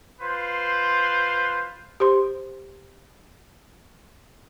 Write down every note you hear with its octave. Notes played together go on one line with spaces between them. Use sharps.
F4 B4 C5
G4 C5 C6